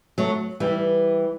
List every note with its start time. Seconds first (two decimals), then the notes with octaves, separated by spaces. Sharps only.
0.18 F#3 A3
0.60 E3 G3